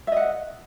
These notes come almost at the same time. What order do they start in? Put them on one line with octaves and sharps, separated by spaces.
E5 D#5 F#5